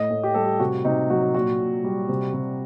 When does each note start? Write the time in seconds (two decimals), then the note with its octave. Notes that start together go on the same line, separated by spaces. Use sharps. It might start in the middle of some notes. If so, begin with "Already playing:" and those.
Already playing: A2 D#5
0.10 A2
0.23 G4
0.34 G3 A4
0.45 G4
0.60 C3 F#4
0.85 C3 D#4
1.10 F#3 F#4
1.34 A#2 F#4
1.60 A#2
1.84 G3
2.09 C3
2.34 C3